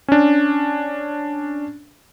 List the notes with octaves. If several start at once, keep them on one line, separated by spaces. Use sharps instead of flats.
C#4 D4